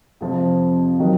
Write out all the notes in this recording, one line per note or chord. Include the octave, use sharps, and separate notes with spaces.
F2 C3 F3
D#3 F#3